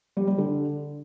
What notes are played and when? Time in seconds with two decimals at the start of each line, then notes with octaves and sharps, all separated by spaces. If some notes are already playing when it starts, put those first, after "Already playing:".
0.17 G3
0.27 G3
0.38 D3